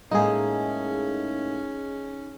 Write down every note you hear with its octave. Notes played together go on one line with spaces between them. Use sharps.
A2 G#3 A#3 C#4 D#4 G#4